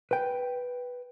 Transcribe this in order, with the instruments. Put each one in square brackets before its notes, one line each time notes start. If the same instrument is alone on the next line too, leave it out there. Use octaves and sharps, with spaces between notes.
[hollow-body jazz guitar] B4 G5